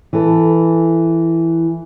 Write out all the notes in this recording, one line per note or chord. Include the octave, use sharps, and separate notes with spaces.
E3 A4